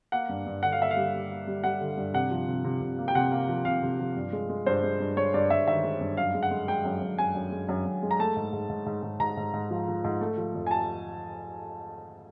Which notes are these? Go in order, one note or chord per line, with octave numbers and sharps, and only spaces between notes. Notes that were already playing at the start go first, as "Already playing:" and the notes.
A#3 F#5
G2
G2
D3 F#5
F5
A#3 E5
F5
G3
A#3
A#3
G3
G3 F#5
D3
G2
C3 F#5
F3
C3
C3
C3
A#3
G5
C3 F#5
A#3
F3
C3 F5
C3
F3
G2
G#3
G#3
G2 C5
G#3
G2
G#3 C#5
G2 D5
G2 E5
D#3 E5
G#3
G2
F#2 F5
G#3
F#5
G#3
G#3 G5
F#2
F#2
F#2 G#5
F#2
G#3
F#2
F#2
G#3
A#5
A3 A5
G#2
G#2
G#2
G#2
G#2
G#2 A#5
G#2
G#2
F3
F3
G#2
A3
F3
F2
G#5
A5